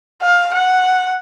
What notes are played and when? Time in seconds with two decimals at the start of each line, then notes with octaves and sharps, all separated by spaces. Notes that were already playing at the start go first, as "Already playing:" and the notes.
0.22 F5
0.53 F#5